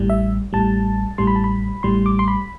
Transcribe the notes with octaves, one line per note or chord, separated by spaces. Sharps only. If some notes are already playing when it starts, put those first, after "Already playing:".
Already playing: A1 A2 G3
E5
A1 A2 G3 A5
A1 A2 G3 C6
B5
A5
B5
A1 A2 G3 C6
D6
C6
B5